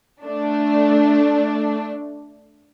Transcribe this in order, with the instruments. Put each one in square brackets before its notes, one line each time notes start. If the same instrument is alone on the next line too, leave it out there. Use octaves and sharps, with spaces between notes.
[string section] A3 D4